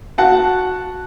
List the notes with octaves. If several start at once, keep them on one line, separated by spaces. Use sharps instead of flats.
F#4 F#5 A5